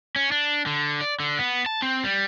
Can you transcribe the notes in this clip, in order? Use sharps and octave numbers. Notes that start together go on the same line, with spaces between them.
C#4
D4
D3
D5
D3
B3
A5
C4
G3